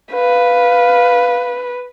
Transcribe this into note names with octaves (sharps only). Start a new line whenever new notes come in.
B4 F5